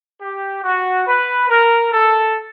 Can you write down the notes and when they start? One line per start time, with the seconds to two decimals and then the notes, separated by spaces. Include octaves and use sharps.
0.20 G4
0.63 F#4
1.06 B4
1.49 A#4
1.92 A4